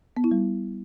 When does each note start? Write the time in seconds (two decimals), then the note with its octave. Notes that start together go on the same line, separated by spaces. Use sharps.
0.17 B3
0.24 E4
0.31 G3